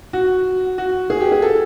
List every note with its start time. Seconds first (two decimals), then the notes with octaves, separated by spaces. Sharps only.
0.13 F#4
0.78 F#4
1.10 G#4
1.21 G4
1.32 G#4
1.42 A4